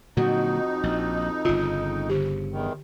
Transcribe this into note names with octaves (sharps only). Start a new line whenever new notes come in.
F2 A#2 D3 F#3 D#4 F#4
A#1
G1 C#3 F4
D3 G4
E2 D#3